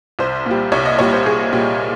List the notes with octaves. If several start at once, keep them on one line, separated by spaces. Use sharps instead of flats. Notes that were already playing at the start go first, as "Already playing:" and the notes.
C2 C5
A#2 G3
C2 C#5
D#5
A#2 G3 C#5
C5
C2 G#4
A#2 G3